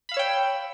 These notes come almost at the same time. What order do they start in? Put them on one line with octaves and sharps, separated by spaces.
B5 F5 E6 C#5 G5